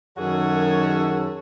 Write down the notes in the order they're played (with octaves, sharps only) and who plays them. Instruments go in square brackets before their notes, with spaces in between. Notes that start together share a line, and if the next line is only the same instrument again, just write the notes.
[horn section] F#2 D#3 F#4 G#4 A4 C#5